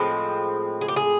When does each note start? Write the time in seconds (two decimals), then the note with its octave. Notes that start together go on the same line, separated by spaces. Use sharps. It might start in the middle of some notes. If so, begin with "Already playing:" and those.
Already playing: A2 F3 G#3 C4
0.81 G#4
0.88 G4
0.96 G#4